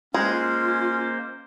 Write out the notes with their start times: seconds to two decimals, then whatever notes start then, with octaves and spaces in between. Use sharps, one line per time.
0.14 G#3 A#3 C#4 F4 C5